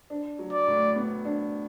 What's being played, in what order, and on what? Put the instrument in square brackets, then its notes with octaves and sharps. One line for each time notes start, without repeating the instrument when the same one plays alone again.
[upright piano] D4
F#3
[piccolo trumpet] D5
[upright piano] A2
B3
D4